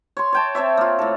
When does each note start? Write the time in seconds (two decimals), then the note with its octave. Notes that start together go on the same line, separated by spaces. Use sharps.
0.17 C#5 C6
0.33 C#5 G5 A5
0.55 C4 A4 C#5 E5
0.77 A#3 F4
0.99 A2 A4